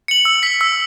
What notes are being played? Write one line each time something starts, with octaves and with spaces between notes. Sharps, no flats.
C#7 F#7
E6
B6 F#7
E6